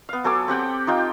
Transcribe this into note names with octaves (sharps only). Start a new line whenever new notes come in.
B3 F5
F#3 A4 G#5 D6
C4 G4 F#5 G5
D#4 F4 G4 G5